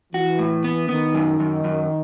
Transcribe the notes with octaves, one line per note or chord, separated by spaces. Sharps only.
E3 F#4
A2
B3
D#3 B3
F#2
F#2
F#2